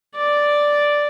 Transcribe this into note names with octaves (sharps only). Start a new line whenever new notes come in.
D5